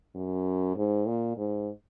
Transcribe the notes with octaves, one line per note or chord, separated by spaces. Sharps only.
F#2
G#2
A#2
G#2